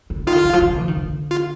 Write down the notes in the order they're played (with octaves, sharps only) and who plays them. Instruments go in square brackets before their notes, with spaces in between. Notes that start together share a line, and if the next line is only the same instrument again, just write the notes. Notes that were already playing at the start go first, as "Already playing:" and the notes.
[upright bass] D3
[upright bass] D#3 [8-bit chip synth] F4
[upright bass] D3
D#3
F3
D#3
A#2
F3
D#3
D3
[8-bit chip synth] F4